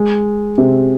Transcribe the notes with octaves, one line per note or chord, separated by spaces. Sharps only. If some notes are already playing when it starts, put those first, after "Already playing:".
Already playing: G#3
C3 C4